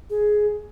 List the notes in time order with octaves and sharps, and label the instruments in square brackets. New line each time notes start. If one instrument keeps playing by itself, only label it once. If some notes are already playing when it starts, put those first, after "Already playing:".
[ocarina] G#4